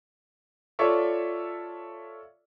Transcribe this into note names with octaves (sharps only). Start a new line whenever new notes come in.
F4 A4 C#5 D5 E5 C#6